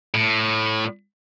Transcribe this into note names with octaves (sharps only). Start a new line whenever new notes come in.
A2